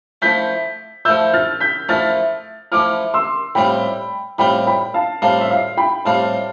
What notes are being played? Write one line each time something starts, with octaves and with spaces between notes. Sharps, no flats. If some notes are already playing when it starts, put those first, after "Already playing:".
F3 A3 E4 G6 B6
F3 A3 E4 E6 G6
F6 A6
G6 B6
F3 A3 E4 F6 A6
F3 A3 E4 D6 F6
C6 E6
A2 G3 C4 F4 G5 B5
A2 G3 C4 F4 G5 B5
G5 B5
F5 A5
A2 G3 C4 F4 F5 A5
E5
F5
G5 B5
A2 G3 C4 F4 F5 A5